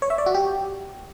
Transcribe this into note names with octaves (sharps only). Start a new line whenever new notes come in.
C#5
E5
D5
F#4
G4